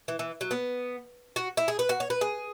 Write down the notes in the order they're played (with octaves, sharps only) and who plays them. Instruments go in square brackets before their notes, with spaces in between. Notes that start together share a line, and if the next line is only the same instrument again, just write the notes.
[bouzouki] E3
E3
F#3
B3
F#4
E4
G#4
B4
F#4
C#5
B4
G#4